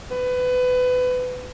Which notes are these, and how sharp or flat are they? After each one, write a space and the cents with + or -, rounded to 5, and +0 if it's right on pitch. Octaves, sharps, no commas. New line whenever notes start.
B4 +25